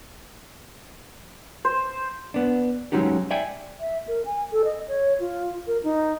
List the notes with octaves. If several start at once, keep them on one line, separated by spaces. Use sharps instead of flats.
C5
B3 D4
F#3 G#3 C#4 D#4 F#4 G4
D5 E5 G5 G#5
E5
A#4
G#5
A4
D#5
C#5
F4
A#4
D#4